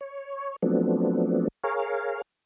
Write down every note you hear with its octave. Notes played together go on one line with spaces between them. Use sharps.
C#5
F3 F#3 A3 B3 C4 D4
G#4 A#4 C#5 F5